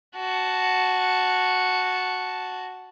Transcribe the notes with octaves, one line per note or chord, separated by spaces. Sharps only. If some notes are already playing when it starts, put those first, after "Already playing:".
F#4 A5